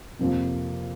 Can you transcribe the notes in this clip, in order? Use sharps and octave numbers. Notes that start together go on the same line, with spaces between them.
F2 C3 F3 A#3 F4